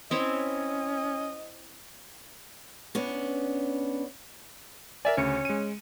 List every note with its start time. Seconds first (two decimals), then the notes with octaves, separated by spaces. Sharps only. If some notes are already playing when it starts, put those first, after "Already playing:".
0.11 C4 C#4 E4 C#5 D#5
2.95 B3 C#4 D4
5.05 A#4 D5 E5 G#5
5.18 D2 C#3 C#4 C#7
5.45 G#3 D#7